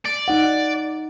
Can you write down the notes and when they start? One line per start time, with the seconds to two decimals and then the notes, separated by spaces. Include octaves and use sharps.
0.05 D5
0.28 D#4 F#5